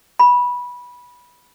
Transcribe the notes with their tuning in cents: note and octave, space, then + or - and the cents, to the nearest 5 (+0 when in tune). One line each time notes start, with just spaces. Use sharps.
B5 -15